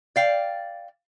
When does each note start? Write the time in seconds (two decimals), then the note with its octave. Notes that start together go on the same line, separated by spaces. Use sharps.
0.16 D5 F5 G5